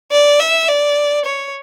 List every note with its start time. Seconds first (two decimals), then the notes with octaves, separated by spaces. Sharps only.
0.11 D5
0.40 E5
0.68 D5
1.25 C#5